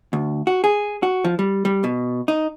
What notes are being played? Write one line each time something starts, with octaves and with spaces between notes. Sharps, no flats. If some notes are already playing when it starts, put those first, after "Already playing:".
D2
F#4
G#4
F#4
F3
G3
G3
B2
D#4